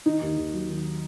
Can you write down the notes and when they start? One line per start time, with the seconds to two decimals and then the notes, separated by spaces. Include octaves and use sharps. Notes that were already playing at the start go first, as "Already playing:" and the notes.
0.06 D#3 D#4
0.21 D#2
0.37 D#2
0.53 F#3
0.69 D#3